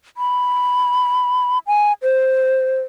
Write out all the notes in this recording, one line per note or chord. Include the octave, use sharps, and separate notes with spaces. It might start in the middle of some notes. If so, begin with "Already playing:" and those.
B5
G#5
C5